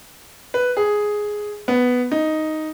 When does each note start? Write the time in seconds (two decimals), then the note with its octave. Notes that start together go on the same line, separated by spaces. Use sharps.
0.54 B4
0.77 G#4
1.68 B3
2.12 D#4